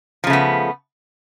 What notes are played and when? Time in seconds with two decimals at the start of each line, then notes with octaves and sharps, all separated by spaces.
0.24 F3
0.27 C#3
0.30 A3
0.33 B3